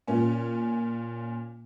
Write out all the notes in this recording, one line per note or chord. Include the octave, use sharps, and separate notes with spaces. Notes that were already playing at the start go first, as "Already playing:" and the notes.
A#2 C#4